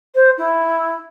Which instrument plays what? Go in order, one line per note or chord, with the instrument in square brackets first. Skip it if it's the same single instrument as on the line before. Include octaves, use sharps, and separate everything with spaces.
[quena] C5
E4